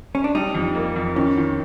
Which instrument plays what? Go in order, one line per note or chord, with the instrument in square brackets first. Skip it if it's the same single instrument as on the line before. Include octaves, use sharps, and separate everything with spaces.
[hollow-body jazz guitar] C#4
D4
[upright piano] G3 [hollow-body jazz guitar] D#4
[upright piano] F2
A#3
F2
[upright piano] D#3 [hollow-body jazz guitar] C#4
[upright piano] D#3